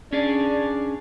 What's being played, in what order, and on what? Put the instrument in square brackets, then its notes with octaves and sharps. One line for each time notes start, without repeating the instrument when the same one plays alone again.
[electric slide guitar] C#4 G#4 D5 [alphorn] D4